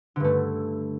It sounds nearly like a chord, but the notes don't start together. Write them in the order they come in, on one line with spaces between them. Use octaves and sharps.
D3 G2 A3